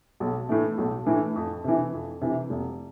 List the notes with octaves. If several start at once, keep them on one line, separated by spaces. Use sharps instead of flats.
B1
A2 E3 A3
B1
A2 E3 A3
F2
C3 E3
F2
C3 E3
F1